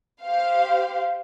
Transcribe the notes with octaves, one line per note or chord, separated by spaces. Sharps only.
G4 C5 F5